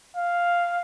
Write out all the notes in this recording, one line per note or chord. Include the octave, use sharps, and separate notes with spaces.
F5